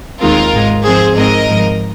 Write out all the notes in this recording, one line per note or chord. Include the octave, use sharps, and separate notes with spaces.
D#2 D#3 G#3 C4 F4 A#4
G#1 G#2 G#3
G#2 F3 C4 G#4 C5
G#2 G#3 C4 A#4 D#5
G#1 G#2 F3